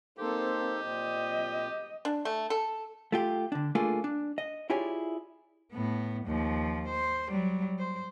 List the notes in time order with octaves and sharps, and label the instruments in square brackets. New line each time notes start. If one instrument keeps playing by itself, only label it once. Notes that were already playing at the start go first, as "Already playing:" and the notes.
[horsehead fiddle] A#3 C4 [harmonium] D#4 A4 C5 [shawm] G4
[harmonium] A#2 C4 [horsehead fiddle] D#5
[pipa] D4
A3
A4
[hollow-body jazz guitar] A3 F4 G4
D3 D4
A3 A#3 D4 F4 G#4
D4
D#5
E4 F4 G4 G#4 C#5 D5
[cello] A2 B3
D#2 F3
C5
F#3 G3
C5